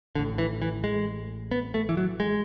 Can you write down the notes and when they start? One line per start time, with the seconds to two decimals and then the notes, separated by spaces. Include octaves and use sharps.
0.15 A1 A2 D3
0.38 E3
0.62 E3
0.84 G#3
1.51 B3
1.74 A3
1.89 E3
1.97 F#3
2.20 G#3